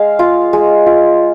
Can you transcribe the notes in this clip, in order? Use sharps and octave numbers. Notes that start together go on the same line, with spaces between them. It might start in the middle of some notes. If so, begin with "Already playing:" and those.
Already playing: G#3 F5
F4
G#3
F4